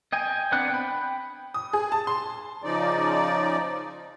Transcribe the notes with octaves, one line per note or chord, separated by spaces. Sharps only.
D#5 G5 G#5
B3 C4 D4 F#5 F#6
G5 B5
D#6
G#4
A5
C6
C#3 F3 D#4 D5